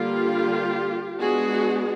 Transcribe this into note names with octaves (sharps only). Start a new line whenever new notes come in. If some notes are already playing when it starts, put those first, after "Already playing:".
Already playing: D3 G3 A#3 F4 G4
G#3 B3 D4 F#4 G#4